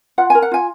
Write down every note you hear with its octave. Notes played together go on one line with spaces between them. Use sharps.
F4 F#5
A#4 G#5
F#5
F4 G#5